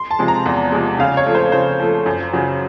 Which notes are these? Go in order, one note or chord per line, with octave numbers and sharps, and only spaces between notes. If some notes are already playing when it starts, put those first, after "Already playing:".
Already playing: C6
A5
C3 F3 G#3
A#5
E2
C3 F3 G#3
C#3 F5
C#5
F3 A3
C5
C#3 C5
F3 A3
F#2
C#3 F#3